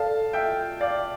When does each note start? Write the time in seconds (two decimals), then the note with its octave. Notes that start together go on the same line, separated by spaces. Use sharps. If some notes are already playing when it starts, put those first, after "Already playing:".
Already playing: A4 D5 F5 A5
0.33 E5 G5
0.81 D5 F5